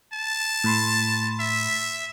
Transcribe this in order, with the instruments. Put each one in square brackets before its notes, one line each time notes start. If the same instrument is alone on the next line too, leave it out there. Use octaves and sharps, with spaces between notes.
[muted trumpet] A5
[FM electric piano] A2 B5 C6
[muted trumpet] E5